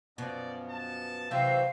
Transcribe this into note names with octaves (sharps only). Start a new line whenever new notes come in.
F#2 B2 F3 B3 D5
A5
C3 E3 F#3 C4 E5 F5 G6